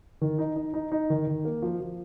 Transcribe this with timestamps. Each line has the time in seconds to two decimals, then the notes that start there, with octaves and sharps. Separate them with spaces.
0.21 D#3
0.39 D#4
0.56 D#4
0.74 D#4
0.92 D#4
1.10 D#3
1.27 D#3
1.45 A#3
1.62 F3
1.80 F3